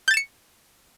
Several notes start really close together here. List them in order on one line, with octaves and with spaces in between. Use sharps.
G6 A6 E7 C#7